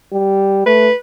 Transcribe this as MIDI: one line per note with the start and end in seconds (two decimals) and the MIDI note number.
0.13 0.63 55
0.66 0.90 57
0.66 0.94 71